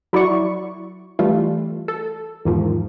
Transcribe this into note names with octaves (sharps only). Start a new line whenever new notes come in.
F#3 E4 F#4 D5 C#6
E3 G3 A3 F4
A4
E2 G#2 D#3 F3